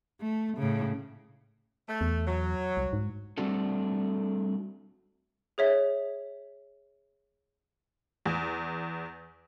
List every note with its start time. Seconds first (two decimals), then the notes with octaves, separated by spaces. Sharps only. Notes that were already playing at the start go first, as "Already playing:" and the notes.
0.21 A3
0.57 A2 C#3
1.88 A3
2.01 E2
2.26 F#3
2.77 C2
2.93 G#2
3.38 G3 A3 C4 D4 F#4 A4
5.58 G#4 C#5 E5
8.26 E2